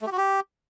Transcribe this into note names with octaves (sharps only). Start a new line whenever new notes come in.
A3
G4
F#4
G4